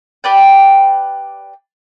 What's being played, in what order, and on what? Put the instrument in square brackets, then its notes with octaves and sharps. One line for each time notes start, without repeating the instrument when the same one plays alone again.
[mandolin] G4 B4 D5 G5